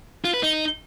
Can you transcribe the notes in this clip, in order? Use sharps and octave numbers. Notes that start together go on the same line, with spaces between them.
F4
B4
D#4